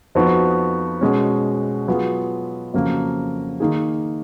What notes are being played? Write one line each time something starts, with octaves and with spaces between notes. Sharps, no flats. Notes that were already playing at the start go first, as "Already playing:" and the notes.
F2 F3 B3 D#4 F#4
B2 G#3 C#4
F#3 B3 F4 G#4
F2 C#3 F#3 A#3
D#3 A#3 D#4 G#4